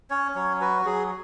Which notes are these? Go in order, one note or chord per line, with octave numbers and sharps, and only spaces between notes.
C#4 C#5
F#3 C#5
F#4 B4
F#3 G#4